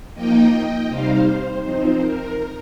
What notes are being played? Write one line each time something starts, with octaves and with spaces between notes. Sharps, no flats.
F3 A#3 D#4 D#5 G5
D#5 G5
C3 G3 D#4 C5 F5
C5
F3 C4 D#4 C5
A#4